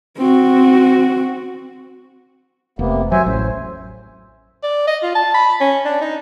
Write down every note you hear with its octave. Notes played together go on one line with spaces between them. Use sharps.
C4 F#4
F1 C3 A#3 B3
F#3 C5 E5 G#5
A1 C5
D5
D#5
F4
A5
B5
C#4
D4
D#4